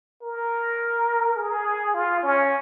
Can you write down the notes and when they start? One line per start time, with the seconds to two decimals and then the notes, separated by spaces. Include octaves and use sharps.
0.22 A#4
1.36 G#4
1.94 F4
2.23 C#4